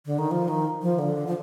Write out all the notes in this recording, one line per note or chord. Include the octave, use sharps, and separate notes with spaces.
D3
D#3
F3
D#3
F3
D3
F3